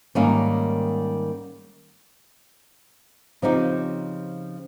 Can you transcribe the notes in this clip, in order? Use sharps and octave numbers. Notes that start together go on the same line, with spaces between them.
G#2 D#3 G3 A#3 C#4
C#3 F3 C4 D#4 G4